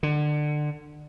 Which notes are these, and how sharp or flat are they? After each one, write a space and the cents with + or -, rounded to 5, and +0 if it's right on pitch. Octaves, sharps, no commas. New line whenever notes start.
D3 +25